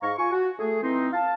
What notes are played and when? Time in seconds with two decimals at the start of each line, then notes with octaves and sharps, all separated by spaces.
0.01 G#2 F5 A#5 C#6
0.18 F4 G#5 C#6
0.32 F#4
0.59 A3 G#4
0.83 E3 C4 D#4 C6
1.13 F5 A5